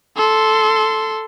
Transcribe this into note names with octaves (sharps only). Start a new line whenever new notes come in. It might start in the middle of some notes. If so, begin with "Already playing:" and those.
A4 C6